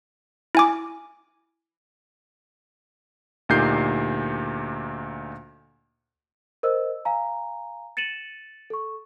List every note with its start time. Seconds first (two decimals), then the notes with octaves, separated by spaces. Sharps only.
0.55 E4 G#5 D6
3.49 D2 A#2 D#4 G4 G6 C7
6.63 A#4 C5 D#5 E6
7.05 F5 G#5 A#5
7.97 A6 C#7 D#7 E7 F#7
8.70 A4 C#6